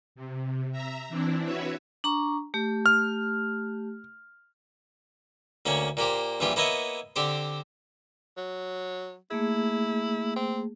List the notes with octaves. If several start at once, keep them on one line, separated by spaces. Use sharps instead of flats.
C3
E5 A#5
E3 C4 D4 E4
F#4 B4 C#5 E5
D4 A#5 C#6
A3 G4
F6
D2 A#3 C#4 C#5
A#2 A#3 G4 C5
A#1 G2 E3 F4 G4
A#3 B3 E4 C#5 D#5 E5
D3 C4 G4 C5
F#3
A3 A#3 E4 G#4
C4